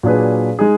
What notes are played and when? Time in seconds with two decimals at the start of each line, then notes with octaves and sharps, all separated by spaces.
0.03 A#2 F#3 D4 G#4 B4
0.59 G#3 D#4 G#4